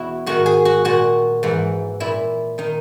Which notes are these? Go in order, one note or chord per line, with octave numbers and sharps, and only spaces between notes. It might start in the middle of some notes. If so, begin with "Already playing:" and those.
Already playing: E2 B2 E4 F#4
G#2 D#3 F#4
G#4
F#4
A#2 F#4
G#2 E3
A#2 E4
D#3 D#4